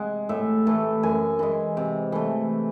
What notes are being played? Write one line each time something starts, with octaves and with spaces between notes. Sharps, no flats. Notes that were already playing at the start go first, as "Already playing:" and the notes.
Already playing: C3 G#3 F#5
A2 E5
E3 A3
F#2 G#5
E3 G#3
C3
E3 A3